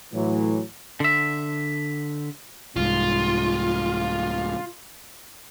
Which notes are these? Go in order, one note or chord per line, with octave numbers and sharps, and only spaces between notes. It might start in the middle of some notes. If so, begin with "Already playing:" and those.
A2 E3 F#3
D3 E5
C2 G#2 F4